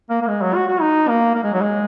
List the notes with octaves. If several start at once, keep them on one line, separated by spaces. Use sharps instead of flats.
A#3
A#3
G#3
F#3
F#4
F#4
D#4
A#3
A#3
G#3
F#3
G#3